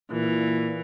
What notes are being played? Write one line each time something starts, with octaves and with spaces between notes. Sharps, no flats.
A#2 E3